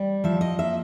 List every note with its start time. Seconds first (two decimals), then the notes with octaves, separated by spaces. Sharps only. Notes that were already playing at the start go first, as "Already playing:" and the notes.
Already playing: G3
0.24 F3 E5
0.41 D#5
0.59 A#3 E5